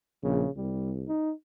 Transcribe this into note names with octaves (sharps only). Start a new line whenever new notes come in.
A#1 C#3
C2 G3
D#4